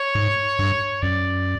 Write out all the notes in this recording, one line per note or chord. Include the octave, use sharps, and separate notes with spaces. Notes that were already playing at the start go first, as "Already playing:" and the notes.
Already playing: C#5
G#2
G2
F#2 D5